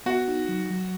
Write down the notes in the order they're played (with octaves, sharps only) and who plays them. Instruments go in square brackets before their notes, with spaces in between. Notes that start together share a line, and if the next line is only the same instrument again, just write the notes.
[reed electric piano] B3 [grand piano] F#4
[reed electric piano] D#4
F#3
F#3